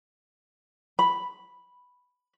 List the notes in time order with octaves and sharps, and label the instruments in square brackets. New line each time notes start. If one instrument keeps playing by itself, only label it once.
[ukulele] B5